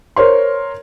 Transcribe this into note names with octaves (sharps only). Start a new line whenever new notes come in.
A#4 C5 C#5 C6